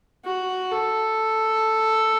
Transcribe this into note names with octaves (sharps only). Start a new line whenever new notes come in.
F#4
A4